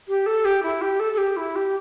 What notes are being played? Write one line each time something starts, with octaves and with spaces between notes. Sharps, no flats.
G4
A4
G4
E4
G4
A4
A4
G4
E4
G4